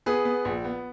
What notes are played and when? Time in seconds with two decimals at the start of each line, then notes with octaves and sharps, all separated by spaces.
0.06 B3 G#4 B4
0.25 B3
0.45 A#1
0.65 B3